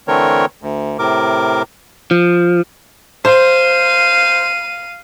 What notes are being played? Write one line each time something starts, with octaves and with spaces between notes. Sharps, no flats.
D3 E3 A3 C4 A#4 C#5
D2
A2 C3 A#4 D6
F3
C5 F5 D#7